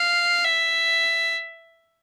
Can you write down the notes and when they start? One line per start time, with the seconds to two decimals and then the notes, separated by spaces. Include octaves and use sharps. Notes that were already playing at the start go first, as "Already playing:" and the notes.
Already playing: F5
0.45 E5